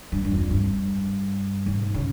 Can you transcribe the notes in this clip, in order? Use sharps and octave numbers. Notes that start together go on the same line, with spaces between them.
G2
G2
F2
G2
G#2
C#3